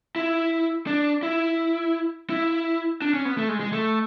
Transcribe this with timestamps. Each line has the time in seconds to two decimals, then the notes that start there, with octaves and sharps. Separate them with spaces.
0.16 E4
0.87 D4
1.23 E4
2.30 E4
3.02 D4
3.14 C#4
3.25 B3
3.38 A3
3.49 G#3
3.60 G#3
3.72 A3